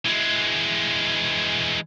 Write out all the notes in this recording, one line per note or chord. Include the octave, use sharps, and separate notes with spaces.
E3 G#3